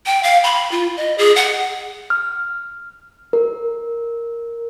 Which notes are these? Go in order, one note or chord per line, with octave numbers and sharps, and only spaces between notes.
G5
F5
B5
F4
D#5
G#4
F#5
F6
A#4